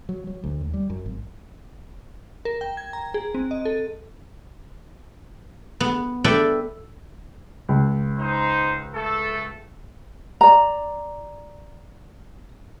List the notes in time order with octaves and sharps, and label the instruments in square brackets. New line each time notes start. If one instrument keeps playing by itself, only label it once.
[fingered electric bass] F#3
F#3
D2
D#2
G3
F#2
G#1
[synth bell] A#4
G5
G#6
A#5
G#4
C4
D#5
A4
[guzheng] B3
A4 B4 D5 E5 G5
[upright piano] C#2
[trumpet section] D#4 C5
A3 A4
[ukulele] D5 A#5